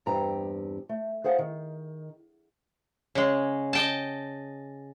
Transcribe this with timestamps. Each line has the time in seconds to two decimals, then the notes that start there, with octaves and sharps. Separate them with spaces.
0.06 E2 G2 C4 G4 A#5
0.89 A3
1.24 G#4 C5 F5 F#5
1.39 D#3
3.15 C#3 G#3
3.73 D#5 G5 A5